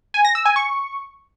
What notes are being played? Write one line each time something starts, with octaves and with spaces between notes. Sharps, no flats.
G#5
A#6
E6
G#5
C#6